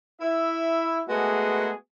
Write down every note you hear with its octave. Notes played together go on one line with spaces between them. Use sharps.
E4 E5
G#3 A3 B3 F#4 G#4 A#4